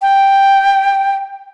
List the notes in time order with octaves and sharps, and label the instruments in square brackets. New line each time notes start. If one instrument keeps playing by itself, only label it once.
[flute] G5